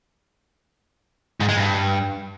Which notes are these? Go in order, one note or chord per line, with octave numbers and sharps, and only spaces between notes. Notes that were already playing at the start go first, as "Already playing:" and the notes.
G#2
G#3
G2